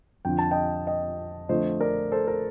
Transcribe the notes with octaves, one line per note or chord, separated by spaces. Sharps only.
F2 D3 F3 G5
A5
D#5 G5
D#5 G5
F2 D3 F3 A3 C5 D#5
A#4 D5
A4 C5
A#4